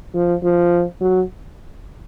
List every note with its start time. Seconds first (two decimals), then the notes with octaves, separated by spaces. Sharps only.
0.15 F3
0.43 F3
1.01 F#3